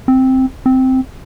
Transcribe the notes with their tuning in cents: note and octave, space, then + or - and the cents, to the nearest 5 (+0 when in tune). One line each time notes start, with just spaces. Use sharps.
C4 +0
C4 -5